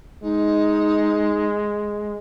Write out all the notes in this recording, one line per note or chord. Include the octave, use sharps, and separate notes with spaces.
G#3 D#4